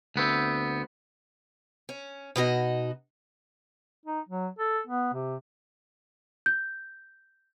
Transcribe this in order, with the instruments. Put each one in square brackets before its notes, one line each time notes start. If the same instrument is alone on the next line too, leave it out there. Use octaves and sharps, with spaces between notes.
[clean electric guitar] D2 B3 C4
[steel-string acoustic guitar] C#4
B2 D#4 F#4 D#5
[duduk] D#4
F#3
A4
B3
C3
[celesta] G6